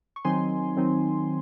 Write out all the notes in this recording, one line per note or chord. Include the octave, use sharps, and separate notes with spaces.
C#6
D#3 F#3 C4 D#4 G#5 C6
D#3 F#3 C4 D#4